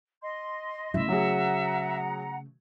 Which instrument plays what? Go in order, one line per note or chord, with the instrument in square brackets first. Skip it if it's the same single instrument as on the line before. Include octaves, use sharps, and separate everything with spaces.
[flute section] D#5 C6
[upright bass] C#3 A3 [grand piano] E4 [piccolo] E5
[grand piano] F#3 G#4 [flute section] F#5 A#5